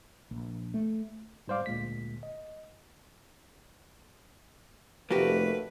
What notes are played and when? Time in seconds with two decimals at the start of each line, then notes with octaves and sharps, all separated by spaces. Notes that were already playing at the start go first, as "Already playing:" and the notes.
0.31 A#1
0.74 A3
1.48 G#2 G3 C5 D5 F5 D6
1.66 D2 A#2 G#3 B6
2.23 D#5
5.11 F1 A3 A#3 F#4 G4 B4